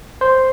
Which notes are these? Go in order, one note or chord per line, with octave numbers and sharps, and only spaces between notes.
C5